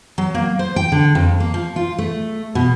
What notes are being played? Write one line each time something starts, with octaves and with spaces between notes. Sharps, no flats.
F#3
A#3
C5
G5
D3
F2
A#3
F3
F4
A3
B2